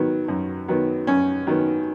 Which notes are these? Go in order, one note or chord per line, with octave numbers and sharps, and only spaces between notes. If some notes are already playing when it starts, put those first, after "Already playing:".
Already playing: D#3 F#3 B3
F#2
D#3 F#3 B3
F#2 C#4
D#3 F#3 B3